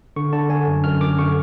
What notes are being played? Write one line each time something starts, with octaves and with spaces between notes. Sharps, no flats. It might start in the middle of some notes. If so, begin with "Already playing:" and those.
D3 C#6
D3 A5
D3 G#5
F#2
F#2 F6
F#2 D6
D3 C#6